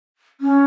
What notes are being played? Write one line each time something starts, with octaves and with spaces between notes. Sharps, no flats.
C#4